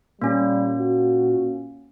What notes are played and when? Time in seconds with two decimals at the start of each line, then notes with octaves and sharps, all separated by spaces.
0.22 A#2 G3 A#3 C#4
0.79 F#4